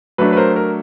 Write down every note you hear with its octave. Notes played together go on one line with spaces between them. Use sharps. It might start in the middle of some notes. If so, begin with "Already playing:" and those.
F#3 A3 D4 B4
B4
A#4 C5
A#4